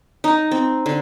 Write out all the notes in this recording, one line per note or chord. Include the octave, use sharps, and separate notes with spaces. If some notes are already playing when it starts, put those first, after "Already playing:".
D#4
C4
D3